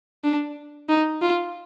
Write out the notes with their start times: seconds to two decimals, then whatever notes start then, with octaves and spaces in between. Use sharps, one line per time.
0.24 D4
0.89 D#4
1.22 F4